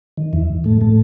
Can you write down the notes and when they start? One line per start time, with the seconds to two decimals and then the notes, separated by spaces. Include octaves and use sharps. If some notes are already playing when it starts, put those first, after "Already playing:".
0.17 D#3
0.33 E2 E3
0.64 A2 A3
0.81 A2 A3